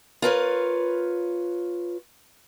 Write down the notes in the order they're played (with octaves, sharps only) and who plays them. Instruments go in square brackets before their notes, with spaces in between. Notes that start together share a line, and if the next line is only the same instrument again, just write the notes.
[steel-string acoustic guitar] F4 A#4 B4 C#5